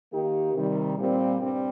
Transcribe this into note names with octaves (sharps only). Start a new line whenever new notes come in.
D#3 A#3 D#4 G4
C3 D#3 G3
A#2 G3 C4
G2 G3 C4